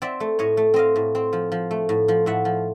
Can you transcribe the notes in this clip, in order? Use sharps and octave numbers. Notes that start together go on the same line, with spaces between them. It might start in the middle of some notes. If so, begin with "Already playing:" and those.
C4 D5 E5
A3
A2 C#5 D#5
A3
C4 D#5 F5
A2
C4
F3
F3
A3
A2
F3
A2 E5 F#5
F3